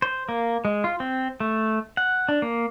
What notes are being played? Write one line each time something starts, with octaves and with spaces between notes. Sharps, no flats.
C5
A#3
G#3
F4
C4
A3
F#5
D4
A#3